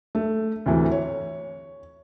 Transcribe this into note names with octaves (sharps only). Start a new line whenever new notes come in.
A3
D2 C3 E3 A3
C#5